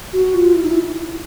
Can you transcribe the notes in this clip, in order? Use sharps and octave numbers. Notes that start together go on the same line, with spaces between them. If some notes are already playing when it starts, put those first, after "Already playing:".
F#4
F4
E4
D#4
E4